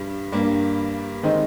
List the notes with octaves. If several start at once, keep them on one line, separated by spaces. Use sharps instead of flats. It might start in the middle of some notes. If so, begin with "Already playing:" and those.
Already playing: G2 G3
G2 G3 A#3
D#3 G#3 C4 D#4